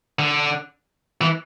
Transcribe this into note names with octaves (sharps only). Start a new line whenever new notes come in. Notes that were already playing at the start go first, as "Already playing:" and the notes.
D3
E3